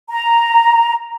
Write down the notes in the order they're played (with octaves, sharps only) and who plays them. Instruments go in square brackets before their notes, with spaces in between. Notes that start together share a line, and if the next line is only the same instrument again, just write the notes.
[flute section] A#5